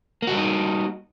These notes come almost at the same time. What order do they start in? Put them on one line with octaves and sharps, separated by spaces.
A#3 F#4 G3 D#4